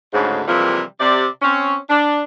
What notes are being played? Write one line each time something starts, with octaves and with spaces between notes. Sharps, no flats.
D2 G#2 C#3
C3 E3 F3 G3 G#3 A#3
C3 D5
C4 C#4 C#5
D4